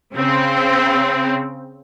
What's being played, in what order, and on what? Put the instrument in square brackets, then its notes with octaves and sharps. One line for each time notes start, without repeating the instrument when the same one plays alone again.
[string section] C#3 C4